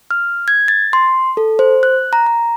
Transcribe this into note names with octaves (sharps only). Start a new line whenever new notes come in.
F6
G#6
A6
C6
A4
C5
F#6
A#5
A#5